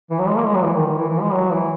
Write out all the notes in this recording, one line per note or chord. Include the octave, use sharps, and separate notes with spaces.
E3
F#3
G#3
A#3
G#3
F#3
E3
D#3
D#3
E3
E3
G#3
F#3
E3